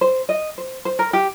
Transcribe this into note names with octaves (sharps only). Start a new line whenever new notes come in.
C5
D#5
C5
C5
A#4
G4